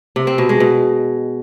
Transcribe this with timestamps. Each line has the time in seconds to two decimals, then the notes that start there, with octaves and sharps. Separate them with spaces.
0.16 C3
0.27 C4
0.38 B2
0.49 G#3
0.60 B2